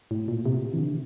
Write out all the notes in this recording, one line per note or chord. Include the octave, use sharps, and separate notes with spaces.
A2
A#2
C3
E3
D3